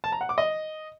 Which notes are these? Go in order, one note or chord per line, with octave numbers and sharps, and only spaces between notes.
A5
A#5
F#5
D6
D#5